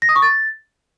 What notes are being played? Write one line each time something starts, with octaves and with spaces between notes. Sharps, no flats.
A#6
D#6
C#6
A6